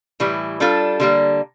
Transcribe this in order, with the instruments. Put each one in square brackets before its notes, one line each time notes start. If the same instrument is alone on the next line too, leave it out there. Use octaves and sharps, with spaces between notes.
[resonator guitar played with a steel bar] A2 E3 G3
G3 D4 F4 A4
D3 G3 A#3